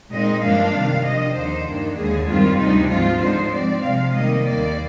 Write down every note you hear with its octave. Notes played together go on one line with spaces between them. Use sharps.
A#2 G#3 C4 D#4 D#5
G2 F3 A#3 D4 F5
C3 D#3 G3
C3 F3 A#3 D4 D#5
D#2 D3 F3 A#3 D#4 C5
G2 D#3 A#3 D4
D#2 D3 G#3 G#4
G2 D#3 G3 C4 F4
D2 C3 G3 D4 D#4
G#2 F3 C4 F4
D3 G#3 D#4 C5
G#2 F3 C4 D5
C3 F3 G#3 F5
C3 D#3 G3 A#3 D#5
D#2 D#3 A#3 D5